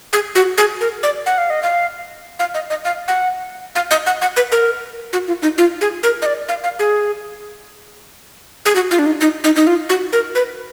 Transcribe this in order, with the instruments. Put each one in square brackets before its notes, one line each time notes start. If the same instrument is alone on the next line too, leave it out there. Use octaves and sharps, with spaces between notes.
[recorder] G#4
F#4
G#4
A#4
D5
F#5
F5
D#5
F5
F5
D#5
D#5
F5
F#5
F5
D#5
F#5
F#5
B4
A#4
F#4
F4
D#4
F4
G#4
A#4
D#5
D5
F5
F5
G#4
G#4
F#4
F4
D4
D#4
D#4
D#4
D#4
F4
F#4
A#4
B4